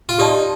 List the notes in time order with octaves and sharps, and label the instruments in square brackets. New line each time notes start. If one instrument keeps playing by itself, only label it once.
[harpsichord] F4
[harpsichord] D#4 [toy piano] G4 D5 A5 C6